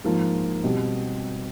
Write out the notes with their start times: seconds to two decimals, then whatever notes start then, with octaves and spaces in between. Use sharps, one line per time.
0.04 G#2 F3 A#3
0.64 B2 G3 C4